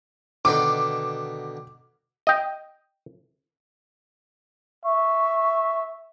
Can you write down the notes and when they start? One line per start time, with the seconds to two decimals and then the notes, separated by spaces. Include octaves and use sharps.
0.45 B2 D3 D#3 D6
2.27 D#5 G5
4.85 E5 C#6